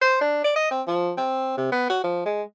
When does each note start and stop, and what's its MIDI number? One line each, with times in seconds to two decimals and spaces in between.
0.01 0.18 72
0.21 0.41 62
0.44 0.52 74
0.56 0.70 75
0.71 0.82 60
0.87 1.12 53
1.17 1.56 60
1.57 1.71 48
1.72 1.88 59
1.90 2.00 66
2.04 2.21 53
2.26 2.42 56